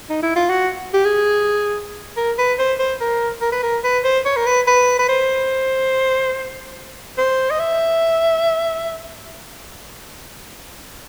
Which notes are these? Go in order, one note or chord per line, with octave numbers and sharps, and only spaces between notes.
D#4
E4
F4
F#4
G4
G#4
A#4
B4
C5
C5
A#4
A#4
B4
A#4
B4
C5
C#5
A#4
B4
B4
B4
C5
C5
D#5
E5